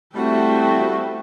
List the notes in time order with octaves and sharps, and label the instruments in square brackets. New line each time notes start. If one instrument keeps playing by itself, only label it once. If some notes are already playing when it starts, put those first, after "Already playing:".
[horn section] G3 E4 F#4 [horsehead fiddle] A3 C4